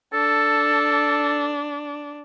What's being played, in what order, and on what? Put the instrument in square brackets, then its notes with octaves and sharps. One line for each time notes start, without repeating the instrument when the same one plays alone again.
[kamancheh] D4 [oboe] A4